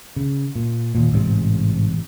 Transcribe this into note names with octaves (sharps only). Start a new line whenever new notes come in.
C#3
A#2
D#2 A#2
A1 G#2 C3